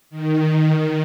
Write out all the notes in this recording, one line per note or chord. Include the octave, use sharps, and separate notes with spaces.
D#3